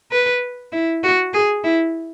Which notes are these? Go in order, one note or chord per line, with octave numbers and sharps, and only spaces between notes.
B4
E4
F#4
G#4
E4